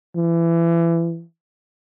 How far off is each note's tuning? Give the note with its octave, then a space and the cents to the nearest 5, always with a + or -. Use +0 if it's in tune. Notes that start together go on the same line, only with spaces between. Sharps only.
E3 +25